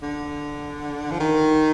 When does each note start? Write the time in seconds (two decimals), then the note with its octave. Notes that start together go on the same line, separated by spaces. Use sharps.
0.02 D3
1.11 F3
1.20 D#3